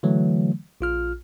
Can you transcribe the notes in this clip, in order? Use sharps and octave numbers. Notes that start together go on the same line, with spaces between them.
D3 E3 F#3 A3
A#1 F4 F6